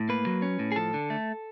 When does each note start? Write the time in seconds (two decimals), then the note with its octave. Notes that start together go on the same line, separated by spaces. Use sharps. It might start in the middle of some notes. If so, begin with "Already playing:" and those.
Already playing: A2
0.09 A#3 B4
0.26 F#3
0.42 C#4
0.59 A2
0.72 G#4
0.76 F3 A4
0.94 D3
1.10 A3